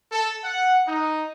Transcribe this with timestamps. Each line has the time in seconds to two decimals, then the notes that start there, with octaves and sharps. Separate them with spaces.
0.11 A4
0.44 F#5
0.86 D#4